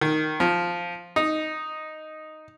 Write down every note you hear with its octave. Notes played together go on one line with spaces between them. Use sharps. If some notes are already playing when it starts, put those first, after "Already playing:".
D#3
F3
D#4